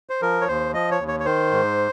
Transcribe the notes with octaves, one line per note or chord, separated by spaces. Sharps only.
C5
F3 A#4
C#5
D#2 C5
F3 D#5
C#5
D#2
C#5
C#5
D#3 C5
G#2